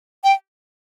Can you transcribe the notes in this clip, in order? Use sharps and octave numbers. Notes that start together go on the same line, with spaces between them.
G5